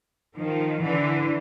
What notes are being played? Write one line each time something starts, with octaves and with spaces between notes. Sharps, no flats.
D#3 F3
D3 E3